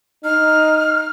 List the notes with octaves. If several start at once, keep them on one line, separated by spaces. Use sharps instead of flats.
D#4 F6